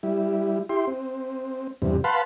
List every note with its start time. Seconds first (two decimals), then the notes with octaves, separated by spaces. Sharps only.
0.03 G3 E4
0.69 E4 G4 C6
0.87 C4
1.82 E2 G2 C3
2.04 B4 F5 F#5 A5 B5 C6